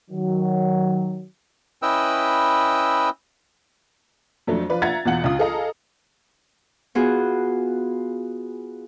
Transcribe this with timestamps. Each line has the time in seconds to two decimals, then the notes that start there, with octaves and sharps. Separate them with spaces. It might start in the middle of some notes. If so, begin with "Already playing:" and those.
0.11 D#3 F#3
1.82 C#4 E4 B4 D#5 G5 E6
4.47 F2 F#3 A3 D4
4.70 F3 F4 B4 D5
4.82 F4 E5 F#5 A#5 G#6 A6
5.05 E2 B2 E3 F4 F#5 F#7
5.24 C#2 F4 F5 D#6
5.39 G#4 A4 D#5 F5 A#5
6.95 B3 F4 F#4 G#4